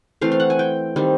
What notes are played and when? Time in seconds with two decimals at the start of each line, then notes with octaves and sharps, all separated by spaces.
0.21 E3 A3 C4 F5
0.32 F5
0.40 F#5
0.50 G#5
0.59 G5
0.96 D#3 G3 C4